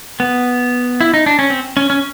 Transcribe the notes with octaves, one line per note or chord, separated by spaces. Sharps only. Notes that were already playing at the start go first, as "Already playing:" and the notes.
B3
E4
D#4
D4
C#4
C4
C#4
C#4